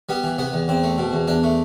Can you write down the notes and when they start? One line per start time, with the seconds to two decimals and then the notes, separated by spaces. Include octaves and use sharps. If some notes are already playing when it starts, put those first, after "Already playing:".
0.09 G3 B3
0.24 E3
0.38 C3 B3
0.53 E2
0.68 E2 C4
0.83 A3
0.98 B2
1.13 E2
1.27 E2 D4
1.43 A3